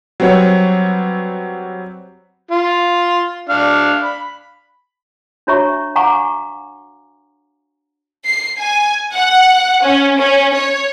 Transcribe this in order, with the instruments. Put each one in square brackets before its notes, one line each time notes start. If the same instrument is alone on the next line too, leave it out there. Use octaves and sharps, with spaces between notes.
[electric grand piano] F#3 G3 C4 B4 C#5 F#5
[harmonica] F4
D4 F5
B5
[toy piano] D4 F#4 C#5 E5 A#5 C#6
F5 F#5 G#5 A#5 C#6 D6
[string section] C7
G#5
F#5
C#4
C#4
C#5